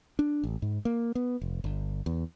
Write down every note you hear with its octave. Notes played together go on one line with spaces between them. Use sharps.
D4
A1
G#2
A#3
B3
F1
G1
E2